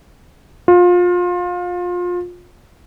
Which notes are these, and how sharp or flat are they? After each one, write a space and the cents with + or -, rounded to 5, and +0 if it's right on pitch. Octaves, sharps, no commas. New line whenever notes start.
F4 +25